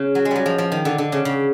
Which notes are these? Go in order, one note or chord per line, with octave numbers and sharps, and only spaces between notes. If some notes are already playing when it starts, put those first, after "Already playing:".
Already playing: C#3
F#3
G#3
F#3 G3
F3
F3
D#3
D3
D3
C#3
C#3